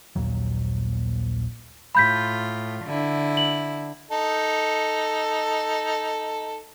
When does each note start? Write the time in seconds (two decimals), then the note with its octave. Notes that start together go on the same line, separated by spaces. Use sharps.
0.16 A#1 D#2 A#2 F#3
1.95 A2 F4 B5 G6 B6
2.86 D3 E4
3.37 F#7
4.11 D#4 A4